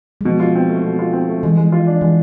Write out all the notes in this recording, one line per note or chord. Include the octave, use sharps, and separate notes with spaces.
G#3
B2 F3
F4
C4
A3
B2
F4
C4
A3
E3 G#3
G#3
F4
D4
E3 G#3